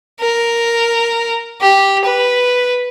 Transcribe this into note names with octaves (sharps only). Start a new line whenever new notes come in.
A#4
G4
B4